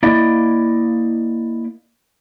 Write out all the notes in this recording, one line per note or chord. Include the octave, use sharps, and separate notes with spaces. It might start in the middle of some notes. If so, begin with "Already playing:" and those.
A#3 E4 D5 D#5